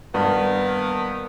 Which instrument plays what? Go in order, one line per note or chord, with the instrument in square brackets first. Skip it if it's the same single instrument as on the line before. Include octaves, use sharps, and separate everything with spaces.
[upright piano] G2 [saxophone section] D#3 A#3 B3